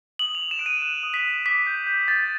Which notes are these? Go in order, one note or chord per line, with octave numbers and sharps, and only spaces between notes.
D#6 F#7
D#6 F7
E7
F#6 D7
D#7
F#6 D#7
D#6
B6
D#6
D6 B6
G6
G6
G6 A6